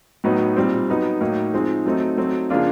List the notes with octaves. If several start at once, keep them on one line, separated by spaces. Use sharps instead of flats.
A2 F#3 B3 D#4
A#2 G3 C4
F#3 B3 D#4
A2 F#3 A#3 D#4
F3 G#3 C4 D#4
F#3 A3 C4 D#4
F#3 A3 C4 D#4
C#3 F3 A#3 D4 F4